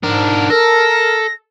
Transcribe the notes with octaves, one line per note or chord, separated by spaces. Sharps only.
G#2 D4 A#4
A4 A#4 A#6